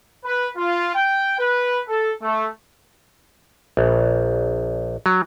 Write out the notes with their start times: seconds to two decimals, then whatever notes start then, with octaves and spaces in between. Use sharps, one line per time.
0.25 B4
0.57 F4
0.95 G5
1.38 B4
1.89 A4
2.22 A3
3.77 A#1
5.06 F#3